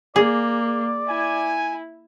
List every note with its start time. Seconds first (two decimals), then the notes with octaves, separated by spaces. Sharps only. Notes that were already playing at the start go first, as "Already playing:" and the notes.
0.16 A#3 G#4 D5
1.08 E4 G#5